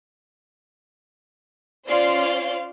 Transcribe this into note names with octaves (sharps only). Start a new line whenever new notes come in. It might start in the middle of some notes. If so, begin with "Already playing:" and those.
C#4 F4 C5 D5 F5 C6